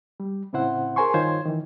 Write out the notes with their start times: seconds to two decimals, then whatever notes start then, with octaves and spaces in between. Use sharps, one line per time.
0.20 G3
0.53 A2 C#3 C4 E4 C5 F#5
0.96 G#4 A#4 C5 G#5 C6 C#6
1.14 G2 D#3 F4 C5 C#5 G#6
1.46 D#3 E3